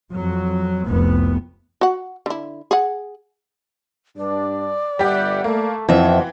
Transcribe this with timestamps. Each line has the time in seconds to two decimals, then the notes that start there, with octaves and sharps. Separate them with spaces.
0.13 F2 F#3
0.88 F1 C2 B3
1.81 F#4 F#5
2.26 D3 E4
2.71 G#4 F#5
4.17 G2 D4 D5
4.99 G1 G3 G4 E5 F#5
5.44 A3 A#3
5.89 F#1 F2 B2 E3 C4 E5 F#5